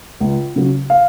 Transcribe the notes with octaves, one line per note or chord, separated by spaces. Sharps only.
C#2
C#3 F#3
F5